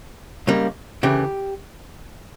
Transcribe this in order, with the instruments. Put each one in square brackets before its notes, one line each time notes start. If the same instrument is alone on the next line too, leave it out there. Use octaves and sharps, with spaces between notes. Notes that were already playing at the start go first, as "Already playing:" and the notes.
[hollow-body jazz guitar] C#2 C#3 G3 A#3
D2 C#3 E3 G4